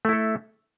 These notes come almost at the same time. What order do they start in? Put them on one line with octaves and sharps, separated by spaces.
A3 E4 A4